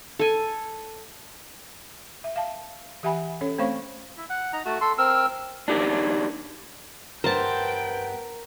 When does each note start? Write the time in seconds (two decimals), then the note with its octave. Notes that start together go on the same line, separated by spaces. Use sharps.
0.19 A4 G#5
2.24 E5
2.36 F5 A5
3.03 E3 G4 E5 F#5 G#5 B5
3.41 C#4 A4 C#5
3.58 A3 C4 C5 C#5 F5 C#6
4.17 E4
4.30 F#5
4.53 D#4 A#5
4.65 A3 F#4
4.81 A4 C6
4.98 C4 A#4 E6
5.68 D4 D#4 G4 G#4 A#4
7.24 G2 B3 A#4 C5 G5 A5 A#5